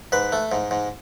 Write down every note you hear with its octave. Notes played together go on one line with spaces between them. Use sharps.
G#2 B4
A3
G#2
G#2